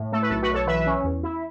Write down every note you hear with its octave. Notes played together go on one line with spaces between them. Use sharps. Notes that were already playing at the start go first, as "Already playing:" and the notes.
Already playing: A2
A3 A4
B4
B1 A4
F#4 B4
B1
A4 C#5
E3 B4 E5
C#4
E2
E4